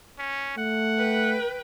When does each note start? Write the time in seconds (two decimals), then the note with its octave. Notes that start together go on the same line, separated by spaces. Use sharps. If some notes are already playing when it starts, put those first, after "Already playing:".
0.18 C#4
0.58 A3 F#5
0.98 B4 G5